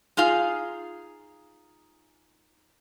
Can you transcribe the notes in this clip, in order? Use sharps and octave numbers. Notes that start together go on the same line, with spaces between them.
D#4 F4 G#4 F5